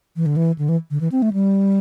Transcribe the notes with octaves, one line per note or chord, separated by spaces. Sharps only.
E3
D3
E3
D3
E3
D3
E3
C4
A3
G3